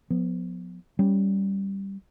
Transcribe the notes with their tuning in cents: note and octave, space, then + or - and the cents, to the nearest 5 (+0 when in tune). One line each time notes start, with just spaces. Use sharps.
F3 +40 B3 +0
G3 -5 C#4 +0